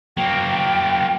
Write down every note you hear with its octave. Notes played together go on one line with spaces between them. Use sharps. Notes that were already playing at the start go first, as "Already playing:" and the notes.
F#3 A#3 G5